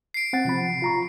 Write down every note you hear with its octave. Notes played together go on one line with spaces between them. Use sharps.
C7 D7
C4 F#5 A6
C3 F3 B5
F4 A#5 C#6